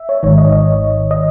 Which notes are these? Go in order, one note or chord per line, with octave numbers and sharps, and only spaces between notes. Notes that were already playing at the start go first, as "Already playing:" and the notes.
Already playing: E5
C#5
G#1 G#2 D#3 C#5
D#5
C#5
D#5
D#5